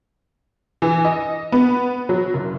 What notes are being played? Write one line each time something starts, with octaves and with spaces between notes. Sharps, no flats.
E3
D#5
B3
F#3
F#1